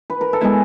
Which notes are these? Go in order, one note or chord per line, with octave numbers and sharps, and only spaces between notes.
B4
A#4
A4
G#3 B3 E4 G#4